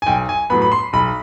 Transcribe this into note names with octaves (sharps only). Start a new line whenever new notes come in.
G#5
B1 G5
G#5
A2 F#3 B3 B5
B5
C6
B1 B5